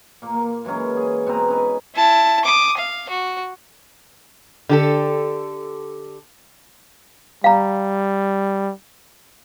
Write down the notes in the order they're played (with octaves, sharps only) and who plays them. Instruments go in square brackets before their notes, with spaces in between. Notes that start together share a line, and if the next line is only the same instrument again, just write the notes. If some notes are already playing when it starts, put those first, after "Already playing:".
[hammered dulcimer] A#2 A#3
A#3
E3 F#3 G#3 C#4
G#4
B2 C4 B4 A#5
C#4 D#4 B4
[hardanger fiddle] E4 A5
D6 D#6
F5
F#4
[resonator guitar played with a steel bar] D3 G4 A4
[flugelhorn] G3 [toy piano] F5 A#5